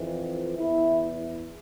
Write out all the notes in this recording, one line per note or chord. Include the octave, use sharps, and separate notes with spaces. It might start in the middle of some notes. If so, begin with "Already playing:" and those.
Already playing: F2 E3
E2 E4